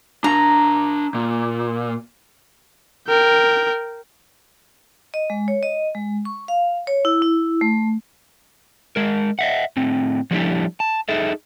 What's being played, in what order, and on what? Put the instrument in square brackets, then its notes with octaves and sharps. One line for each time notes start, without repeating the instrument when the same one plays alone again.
[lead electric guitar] D4 F5 [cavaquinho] A#5
[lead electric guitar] A#2
[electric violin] A#4 G5
[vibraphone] D#5
G#3
C#5
D#5
G#3
C#6
F5
C#5
E4
E4
A3
[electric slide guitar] G#3 A#4
D#5 E5 F#5
A2 C4
F3 G3 A3 D4 E4 G4
A5
D#4 G#4 A4 E5